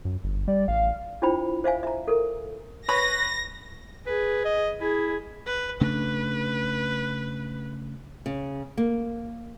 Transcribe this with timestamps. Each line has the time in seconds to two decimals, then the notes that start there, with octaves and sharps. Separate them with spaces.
0.05 F#2
0.24 G1
0.48 G3 D5
0.68 A1 F5
1.22 D4 E4 F4 C5 G5 B5
1.64 C5 E5 F5 G#5
1.83 E5 A#5
2.08 A4 A#4
2.88 B4 C#5 B5 A#6
4.07 G#4 B4
4.45 D#5
4.81 E4 G#4
5.46 B4
5.81 C#3 A3 D4 B4
8.26 C#3
8.77 A#3